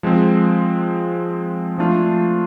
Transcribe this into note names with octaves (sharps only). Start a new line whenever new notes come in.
F3 G#3 C4
F3 A3 D4 F4